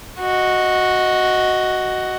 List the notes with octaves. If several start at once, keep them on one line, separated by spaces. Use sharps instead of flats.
F#4 D#5